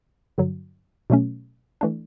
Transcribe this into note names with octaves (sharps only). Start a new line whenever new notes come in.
G2 D3 F#3
B2 F#3 A3 C#4
E3 A3 D4